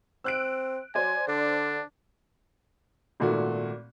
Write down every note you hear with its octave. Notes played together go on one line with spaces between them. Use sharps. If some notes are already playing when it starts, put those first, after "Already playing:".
C4 E6 F#6 D7
F#3 C5 D5 G#5
D3 D4
G#1 A#2 A3 F#4